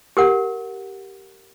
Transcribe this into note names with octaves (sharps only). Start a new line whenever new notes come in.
G4 A#4 F#5